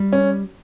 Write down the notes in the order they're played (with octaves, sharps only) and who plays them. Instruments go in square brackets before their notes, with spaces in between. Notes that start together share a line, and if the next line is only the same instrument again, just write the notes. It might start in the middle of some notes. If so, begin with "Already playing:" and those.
Already playing: [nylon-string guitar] G3
[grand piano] C#4